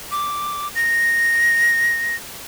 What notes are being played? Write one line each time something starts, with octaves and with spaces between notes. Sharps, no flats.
D6
A#6